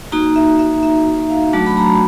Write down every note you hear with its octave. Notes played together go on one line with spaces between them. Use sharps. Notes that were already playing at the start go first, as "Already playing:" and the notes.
A#3 D#4 F#4 A#5
E5
E5
E5
F5
F#3 A3 D4 F#4 A5
B5
A#5